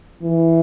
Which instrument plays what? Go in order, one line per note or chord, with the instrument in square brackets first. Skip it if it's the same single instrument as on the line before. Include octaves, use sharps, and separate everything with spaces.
[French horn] E3